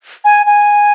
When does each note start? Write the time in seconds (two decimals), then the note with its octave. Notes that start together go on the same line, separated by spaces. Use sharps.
0.24 G#5
0.46 G#5